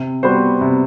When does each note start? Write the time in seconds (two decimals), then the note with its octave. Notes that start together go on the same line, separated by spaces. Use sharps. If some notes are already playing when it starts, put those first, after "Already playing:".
Already playing: C3
0.23 G3 B3 F#4 C5
0.61 C3